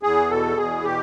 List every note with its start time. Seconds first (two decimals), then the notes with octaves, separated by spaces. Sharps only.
0.03 E2 G#4
0.30 B2 A4
0.57 E2 G#4
0.84 B2 G4